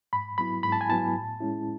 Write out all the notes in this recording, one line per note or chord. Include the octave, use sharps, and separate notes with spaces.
G#2 B5
F#3 B3 E4 B5
G#2 B5
A5
G#5
F#3 B3 E4 A5
A2
G#3 C#4 E4